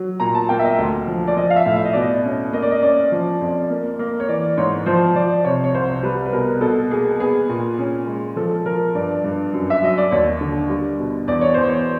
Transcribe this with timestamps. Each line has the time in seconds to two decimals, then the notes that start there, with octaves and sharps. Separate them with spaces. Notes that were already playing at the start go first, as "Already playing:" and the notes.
Already playing: F#3
0.20 A#2 A#5
0.35 A5
0.49 A#3 G5
0.59 E5
0.64 D#5
0.78 D2
1.07 F3
1.27 D5
1.37 F3 D#5
1.50 F5
1.56 E5
1.66 A2
1.76 E5
1.85 D#5
1.93 B2 D5
2.02 D#5
2.25 C#4
2.53 A#3 D#5
2.62 D5
2.71 D#5
2.82 C#4 D5
3.12 F3
3.41 F2
3.70 A#3
3.99 A#3
4.20 C#5
4.29 E3 D5
4.57 G#2 C#5
4.86 F3 C5
5.15 F3 D5
5.45 C3 C#5
5.64 C#5
5.74 C2 C5
6.03 G3 B4
6.26 B4
6.32 B2 A#4
6.61 B2 A4
6.90 A#3 G#4
7.20 B3 G#4
7.49 A#2
7.78 C#4
8.07 G#3
8.36 F3 A4
8.66 F3 A#4
8.95 G2 D5
9.24 G2
9.53 F#2
9.70 E5
9.82 F#3 D#5
9.98 D5
10.11 D#2 C#5
10.41 D3
10.69 G3
10.99 B2
11.27 E2 D5
11.41 C#5
11.54 E2 C5
11.68 C#5